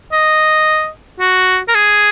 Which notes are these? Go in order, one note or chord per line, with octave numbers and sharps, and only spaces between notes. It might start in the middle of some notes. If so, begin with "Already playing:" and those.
D#5
F#4
A#4
G#4